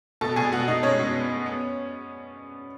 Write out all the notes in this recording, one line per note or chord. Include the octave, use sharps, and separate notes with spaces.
B2 A4 A5
B2 G#4 G#5
B2 F#4 F#5
B2 D#4 D#5
G#3 C#4 C#5
B2
B3
B3
B3